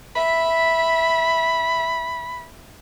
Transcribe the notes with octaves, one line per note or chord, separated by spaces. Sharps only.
E5 B5